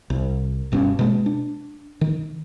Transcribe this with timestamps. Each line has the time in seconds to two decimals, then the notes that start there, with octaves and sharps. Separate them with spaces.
0.10 C2
0.72 F#1 G2 B2 C#4
0.99 B2 G#3 A#3
1.26 D4
2.01 D#3